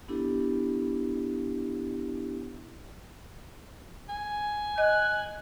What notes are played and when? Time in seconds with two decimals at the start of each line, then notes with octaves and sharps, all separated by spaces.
0.08 B3 D4 E4 G4 A4
4.09 G#5
4.78 D#5 F#6